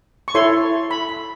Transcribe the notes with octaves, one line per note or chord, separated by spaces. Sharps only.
C#6
E4 A4 C#5 C6
B5
B5